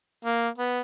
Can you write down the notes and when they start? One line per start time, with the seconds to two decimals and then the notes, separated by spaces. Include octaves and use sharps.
0.25 A#3
0.58 B3